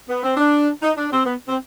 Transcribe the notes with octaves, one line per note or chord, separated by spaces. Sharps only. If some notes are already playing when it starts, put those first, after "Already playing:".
B3
C4
D4
D#4
D4
C4
B3
C4